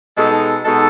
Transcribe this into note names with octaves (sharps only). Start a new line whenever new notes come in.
B2 G#3 D#4 A4
B2 G#3 D#4 A4